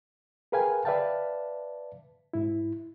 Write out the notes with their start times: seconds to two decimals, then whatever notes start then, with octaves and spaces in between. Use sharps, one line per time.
0.52 G#4 A#4 B4 F5 G5 G#5
0.85 B4 D5 E5 F5 G5 A5
2.33 G#2 E4